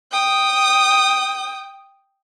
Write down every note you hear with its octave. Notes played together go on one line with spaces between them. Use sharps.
G5 D#6